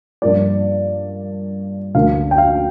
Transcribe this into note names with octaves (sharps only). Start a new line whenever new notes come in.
G2 F3 A#3 D5
D2 D3 A#3 F5
G5
F5